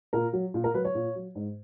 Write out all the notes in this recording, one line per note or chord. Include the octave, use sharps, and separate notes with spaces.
A#2 A#4
F#3
A#2
A#4
F#3 B4
C#5
A#2
F#3
G#2